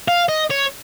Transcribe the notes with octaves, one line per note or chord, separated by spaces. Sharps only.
F5
D#5
C#5